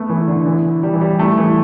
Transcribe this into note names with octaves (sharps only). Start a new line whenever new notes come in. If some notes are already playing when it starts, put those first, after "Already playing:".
Already playing: A3 B3
E3
D3
E3
G3
E3
G3
A3
E3